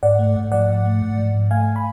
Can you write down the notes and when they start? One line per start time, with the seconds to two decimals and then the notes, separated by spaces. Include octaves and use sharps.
0.03 G#2 D5 F#5
0.19 A3
0.36 G#2
0.52 F3 D5 F#5
0.69 G#2
0.85 A3
1.02 G#2
1.18 F3
1.35 G#2
1.51 A3 F5 G#5
1.76 G#5 B5